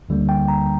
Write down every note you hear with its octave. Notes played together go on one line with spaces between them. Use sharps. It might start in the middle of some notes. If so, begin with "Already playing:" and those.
D2 D3 G3 A#3
G5
A#5